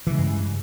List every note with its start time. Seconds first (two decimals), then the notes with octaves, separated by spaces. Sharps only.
0.07 E3
0.11 C#3
0.14 G#3
0.18 G2